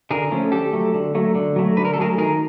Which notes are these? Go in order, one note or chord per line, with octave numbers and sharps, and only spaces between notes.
D3 G#4 A#4
F3 A3 C#4
D3 G4 A4
F#3 A3
D3
F#3 A3
D3
F#3 A3
D3 B4
A#4
A4
F#3 A3 G#4 A#4
D#3 G#4 A#4